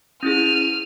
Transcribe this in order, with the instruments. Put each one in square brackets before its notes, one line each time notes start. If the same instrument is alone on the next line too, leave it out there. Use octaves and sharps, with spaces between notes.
[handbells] C#4 E4 G#4 [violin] F6 D#7